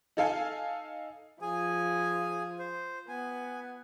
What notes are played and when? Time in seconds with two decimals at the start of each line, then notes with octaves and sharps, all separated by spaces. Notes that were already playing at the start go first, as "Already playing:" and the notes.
0.17 D#4 A4 F5 G#5
1.42 F3 G#4 G#5
2.59 C5
3.08 B3 G#5